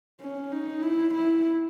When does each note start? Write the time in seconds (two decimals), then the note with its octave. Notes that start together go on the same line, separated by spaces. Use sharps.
0.21 C#4
0.52 D#4
0.83 E4
1.14 E4